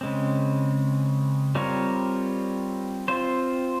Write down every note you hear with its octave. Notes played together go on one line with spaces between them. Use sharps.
C#3 G#3 C4
G3 C4 F4 A#4 C#5
C4 F4 C5